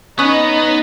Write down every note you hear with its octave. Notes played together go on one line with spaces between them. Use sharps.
B3 C#4 D#4 C#6 D#6 F#6